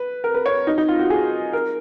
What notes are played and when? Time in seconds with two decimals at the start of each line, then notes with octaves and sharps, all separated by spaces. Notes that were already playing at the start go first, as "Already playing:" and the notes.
Already playing: B4
0.24 A#4
0.34 B4
0.46 C#5
0.67 D#4
0.78 D#4
0.88 F4
0.99 F#4
1.10 G#4
1.53 A#4